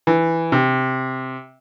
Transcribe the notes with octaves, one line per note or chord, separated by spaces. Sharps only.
E3
C3